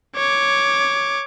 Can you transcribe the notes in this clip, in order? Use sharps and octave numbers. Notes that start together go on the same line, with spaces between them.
C#5 D6